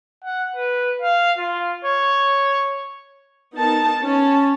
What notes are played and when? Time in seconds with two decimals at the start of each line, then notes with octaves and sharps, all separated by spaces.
0.24 F#5
0.56 B4
1.02 F5
1.38 F4
1.85 C#5
3.56 B3 D#4 A#4 A5
4.03 C#4 A5